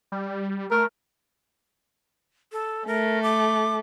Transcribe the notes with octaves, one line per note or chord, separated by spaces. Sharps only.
G3
A3 A#4
A4
A3 A#4
D6